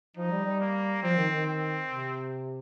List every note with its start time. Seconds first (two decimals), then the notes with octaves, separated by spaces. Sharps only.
0.17 F3 D#4
0.31 G3
0.45 G3
0.60 A#3
1.02 F3 C4
1.17 D#3
1.31 D#3
1.46 C4
1.89 C3